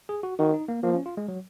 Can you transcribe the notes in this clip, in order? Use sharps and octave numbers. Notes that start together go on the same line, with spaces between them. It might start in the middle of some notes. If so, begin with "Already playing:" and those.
G#4
F#4
D#3 F#4
D#4
A#3
F3 A#3
C#4
F4
G#3
F#3